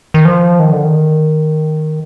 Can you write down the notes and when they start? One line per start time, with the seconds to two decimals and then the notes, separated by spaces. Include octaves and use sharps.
0.14 D#3
0.25 F3
0.59 D#3
0.72 D3
0.84 D#3